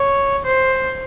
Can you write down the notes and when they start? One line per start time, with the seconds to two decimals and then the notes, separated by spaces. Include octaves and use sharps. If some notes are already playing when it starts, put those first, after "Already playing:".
Already playing: C#5
0.45 C5